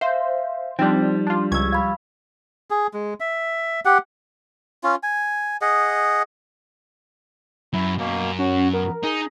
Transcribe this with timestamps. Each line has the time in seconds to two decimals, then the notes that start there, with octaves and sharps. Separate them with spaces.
0.01 C5 E5 F5
0.79 F3 G3 C4 D4 D#4
1.27 D4 F4
1.52 C#2 C#6 E6 G#6
1.73 F5 B5
2.71 G#4
2.94 G#3
3.20 E5
3.85 G4 F#5
4.84 C#4 F4
5.03 G#5
5.61 G#4 D#5 F#5
7.73 F#2 E4
7.99 F#2 B2 A#3
8.39 C#4 F#4
8.73 B3 A#4
9.03 D#4 G#4